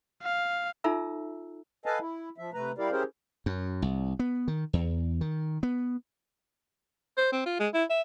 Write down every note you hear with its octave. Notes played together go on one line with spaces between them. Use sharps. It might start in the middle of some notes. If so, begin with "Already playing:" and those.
F5
D#4 F4 A4 E5 A#5 E6
A4 B4 D#5 F5 G#5 A5
E4
F3 E5
C3 A3 B4 A#5
G3 E4 G4 A#4 D5 F5
C#4 E4 G4 G#4 A#4 C5
F#2
C2
B3
D#3
E2
D#3
B3
C5
C4
F4
G#3
E4
E5